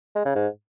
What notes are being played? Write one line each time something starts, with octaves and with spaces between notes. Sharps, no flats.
G#3
C#3
G#2